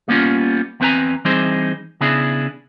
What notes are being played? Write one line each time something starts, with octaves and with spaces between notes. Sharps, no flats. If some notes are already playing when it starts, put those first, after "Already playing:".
G3 A#3 B3 C#4 F4
E2 B3 C4 B4 G#5 A#5
E3 G3 C4 D#4 G#4 C5
C#3 B3 D4 E4 G#4